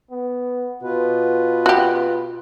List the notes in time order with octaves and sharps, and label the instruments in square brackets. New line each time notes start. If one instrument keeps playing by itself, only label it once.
[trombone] B3
[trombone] B2 [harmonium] F4 B4
[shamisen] F#4 G4